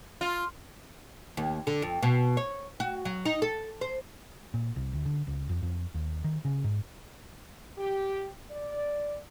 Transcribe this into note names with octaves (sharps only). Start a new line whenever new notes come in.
F4
D#2
D3
F2
B2
C#5
F#4
F#3
D#4
A4
C5
A#2
C2
D2
D3
C#2
F2
F2
D#2
D#3
C#3
G#2
G4
D5